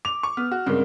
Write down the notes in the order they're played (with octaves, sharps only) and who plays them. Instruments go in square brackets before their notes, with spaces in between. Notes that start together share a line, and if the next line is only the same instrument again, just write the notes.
[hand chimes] D6 [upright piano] F7
[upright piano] C#6
[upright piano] B3 [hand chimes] F6
[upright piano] F#4
[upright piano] G2 C#3 G#3 [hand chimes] C4 A#4